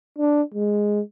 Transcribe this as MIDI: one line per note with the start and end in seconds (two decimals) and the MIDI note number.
0.18 0.42 62
0.54 1.00 56